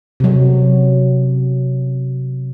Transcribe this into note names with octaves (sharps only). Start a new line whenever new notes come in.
C3 F#3